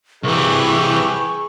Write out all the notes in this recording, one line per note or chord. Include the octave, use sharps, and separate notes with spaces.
C2 E3 G4 G#4 B4 E5 C#6